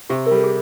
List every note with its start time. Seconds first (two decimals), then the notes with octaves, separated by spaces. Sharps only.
0.10 C3 G4
0.26 A#4
0.31 G3 A4
0.44 G#4